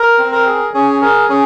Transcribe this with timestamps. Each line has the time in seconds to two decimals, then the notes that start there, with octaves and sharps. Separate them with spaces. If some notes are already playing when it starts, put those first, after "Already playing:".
Already playing: A#4
0.18 C4
0.32 A#4
0.46 G#4
0.74 C#4 G#4
1.02 G#4 A#4
1.29 C#4 G#4